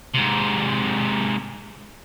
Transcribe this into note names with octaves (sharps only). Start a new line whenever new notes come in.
G#2 C3